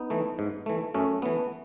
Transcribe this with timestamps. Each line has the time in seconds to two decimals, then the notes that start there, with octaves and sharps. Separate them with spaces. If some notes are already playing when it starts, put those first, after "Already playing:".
Already playing: B3 D#4
0.10 E3 A3
0.39 G#2
0.66 E3 A3
0.94 F#2 A3 C#4
1.22 E3 A3 B3